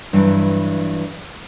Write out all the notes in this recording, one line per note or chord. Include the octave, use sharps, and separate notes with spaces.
G2 E3 F#3